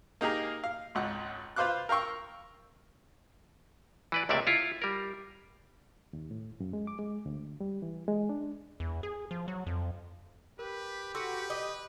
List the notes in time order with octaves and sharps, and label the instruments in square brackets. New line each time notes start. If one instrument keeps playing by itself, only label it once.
[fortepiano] A#3 D#4 G4 G#4 A#4
F5
G#1 C#2 F#5
F4 B4 C5 F5 D6 F#6
A#4 F5 G5 C#6 E6
[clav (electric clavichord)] E3 B4 D5
C#2 C3 A3 A#3 D5 E5
E4 F4
G3 A#4
[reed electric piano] D#2
A2
F#2
G#3
D6
G#3
D2
G3
E3
G#3
D4
[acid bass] E2
G#4
F3
F#3
F2
[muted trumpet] G4 [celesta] A#4 [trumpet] B4
[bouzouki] F#4 [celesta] A4 C6 E6 [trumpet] B4
[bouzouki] D#5 [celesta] D6